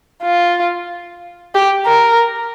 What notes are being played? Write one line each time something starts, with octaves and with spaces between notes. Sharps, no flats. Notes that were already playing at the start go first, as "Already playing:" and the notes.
F4
G4
A#4